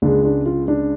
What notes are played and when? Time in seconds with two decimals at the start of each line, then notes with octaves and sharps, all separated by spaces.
0.02 C#2 C#3 G#3 D4
0.25 D4
0.46 F4
0.68 D4